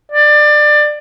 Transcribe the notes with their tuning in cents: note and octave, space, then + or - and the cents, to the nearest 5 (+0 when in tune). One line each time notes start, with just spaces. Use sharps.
D5 +20